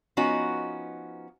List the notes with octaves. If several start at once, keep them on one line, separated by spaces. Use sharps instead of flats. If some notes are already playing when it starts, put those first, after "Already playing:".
F3 B3 C#4 D#4 F#4